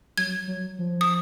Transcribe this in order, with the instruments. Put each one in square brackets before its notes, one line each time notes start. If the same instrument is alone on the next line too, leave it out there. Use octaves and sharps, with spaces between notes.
[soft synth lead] F#3 [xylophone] G#6
[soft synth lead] F#3
F3
[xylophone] D#6